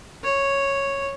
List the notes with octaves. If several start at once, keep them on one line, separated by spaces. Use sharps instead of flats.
C#5